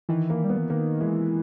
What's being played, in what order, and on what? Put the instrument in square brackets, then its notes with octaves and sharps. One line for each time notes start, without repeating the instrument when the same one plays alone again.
[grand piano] D#3 [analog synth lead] E3
[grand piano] A#3
[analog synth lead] G3 [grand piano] B3
[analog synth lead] E3
[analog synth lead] D#3 [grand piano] A#3
[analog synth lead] E3 [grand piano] G#3